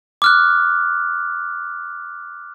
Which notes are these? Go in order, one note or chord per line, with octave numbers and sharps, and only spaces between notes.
D6 F6 F#6